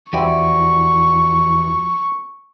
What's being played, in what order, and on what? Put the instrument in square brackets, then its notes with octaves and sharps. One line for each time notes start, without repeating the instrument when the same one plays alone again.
[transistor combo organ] E2 [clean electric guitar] F3 F#4 D5 [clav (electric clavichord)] C4 E4 G4 [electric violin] C#6